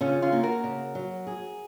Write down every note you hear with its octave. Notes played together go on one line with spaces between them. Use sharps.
C#3 C#4 F4
C#4 F4
A#3
F#4 A#4
C#3
F#3
G#4